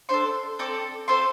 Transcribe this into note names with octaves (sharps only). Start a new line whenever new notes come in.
D4 A4 C5 C6
C4 A4 D5 D6
C4 F4 A4 C5 C6